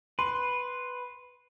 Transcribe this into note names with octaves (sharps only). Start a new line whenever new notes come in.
B4 C6